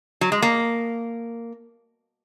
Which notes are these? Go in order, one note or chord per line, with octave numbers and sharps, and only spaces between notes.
F#3
G#3
A#3